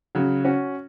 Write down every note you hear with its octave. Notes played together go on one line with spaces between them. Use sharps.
C#3 F#3
C#4 F#4